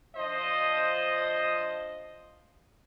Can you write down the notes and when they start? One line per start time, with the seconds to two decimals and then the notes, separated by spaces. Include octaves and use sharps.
0.16 F3 D4 C5 D#5